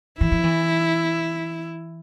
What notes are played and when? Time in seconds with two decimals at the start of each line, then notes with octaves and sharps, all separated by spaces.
0.20 E3 E4
0.32 F3
0.44 E3